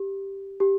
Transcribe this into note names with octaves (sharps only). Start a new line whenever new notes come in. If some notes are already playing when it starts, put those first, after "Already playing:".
Already playing: G4
G4